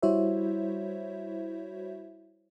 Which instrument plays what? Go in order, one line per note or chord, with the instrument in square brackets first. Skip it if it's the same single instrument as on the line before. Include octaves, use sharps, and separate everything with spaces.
[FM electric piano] G3 E4 F#4 C5 C#5 E5